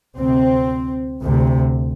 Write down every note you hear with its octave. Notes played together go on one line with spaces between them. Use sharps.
D2 C3 C4
D2 C3